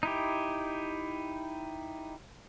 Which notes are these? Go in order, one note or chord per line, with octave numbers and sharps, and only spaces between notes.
D#4 E4 G4